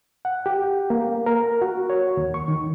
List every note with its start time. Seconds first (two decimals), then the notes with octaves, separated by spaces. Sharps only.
0.25 F#5
0.46 G4
0.90 A#3
1.26 A#4
1.62 F#4
1.90 C#5
2.17 D#2
2.34 C#6
2.48 D#3